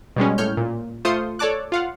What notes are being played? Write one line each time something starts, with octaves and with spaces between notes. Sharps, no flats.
B2 G3 G#3 C#4
A2 C#5 F6 G6
A#2
A3 F4 C5 C6 D#6 C#7
A4 C#5 D5 A5 D6 F#6
F4 F5 F#5